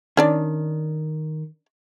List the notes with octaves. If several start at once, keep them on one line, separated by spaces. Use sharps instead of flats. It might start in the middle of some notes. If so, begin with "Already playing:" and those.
D#3 C#4 D4 D5